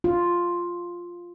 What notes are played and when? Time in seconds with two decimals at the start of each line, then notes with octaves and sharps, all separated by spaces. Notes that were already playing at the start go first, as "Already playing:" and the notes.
0.04 F4